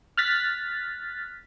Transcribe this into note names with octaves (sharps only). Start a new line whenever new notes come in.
F6 F#6 A6 B6